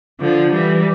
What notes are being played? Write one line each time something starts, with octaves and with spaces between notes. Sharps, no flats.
D3 F3
E3 G3